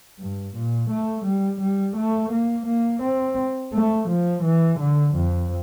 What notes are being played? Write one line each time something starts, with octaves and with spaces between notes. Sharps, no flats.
G2
A#2
A3
G3
G3
A3
A#3
A#3
C4
A3
F3
E3
D3
F2